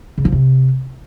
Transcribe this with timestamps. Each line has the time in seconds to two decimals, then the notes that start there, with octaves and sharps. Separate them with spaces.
0.18 C#3
0.25 F3
0.33 C3